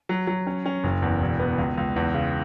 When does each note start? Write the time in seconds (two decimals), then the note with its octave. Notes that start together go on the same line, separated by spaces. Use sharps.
0.09 F#3
0.27 F#3
0.47 C#4
0.66 C#4
0.84 F#1
1.02 E2
1.20 E1
1.39 B3
1.58 C#2
1.77 C#2
1.96 E2
2.14 C#3